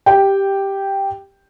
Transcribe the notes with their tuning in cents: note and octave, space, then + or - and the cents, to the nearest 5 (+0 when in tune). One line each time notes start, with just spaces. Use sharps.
G4 +0 G5 +0